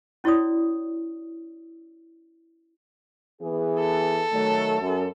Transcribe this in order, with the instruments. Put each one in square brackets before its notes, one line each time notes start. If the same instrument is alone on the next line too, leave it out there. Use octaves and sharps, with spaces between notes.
[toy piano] C#4 E4 F#4 C#5 D5 D#6
[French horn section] E3 B3 G#4
[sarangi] A4
[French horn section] D#3 F#3 A3
F#2